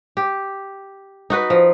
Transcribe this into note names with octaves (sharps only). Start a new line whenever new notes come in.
G4
D#4 F#4 B4
F3